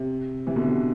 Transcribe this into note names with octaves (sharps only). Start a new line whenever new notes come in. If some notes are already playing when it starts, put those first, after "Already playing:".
Already playing: C3
C3 E3
B2 D3
C3